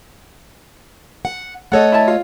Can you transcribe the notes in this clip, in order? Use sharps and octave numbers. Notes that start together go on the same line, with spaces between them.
F#5
A3 A4 C#5 D#5 F#5
E4 A5
F4